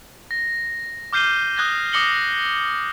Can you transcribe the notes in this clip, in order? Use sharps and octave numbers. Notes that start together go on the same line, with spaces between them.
A#6
D6 F6 G6 C7 D#7 G7
D6 D#6 F#6 G#6 A#6 G7
D6 D#6 A#6 C#7 F#7 G7